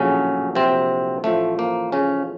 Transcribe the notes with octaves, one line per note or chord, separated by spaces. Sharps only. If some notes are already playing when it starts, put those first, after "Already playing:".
Already playing: A#1 A2 C#3 F#3 C#4
C3 C4
A1 A2 F3 A3
A#3
C#3 C#4